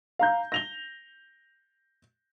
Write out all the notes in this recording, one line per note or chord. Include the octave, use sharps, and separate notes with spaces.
F5 A#5 G6
A#6 F7 G7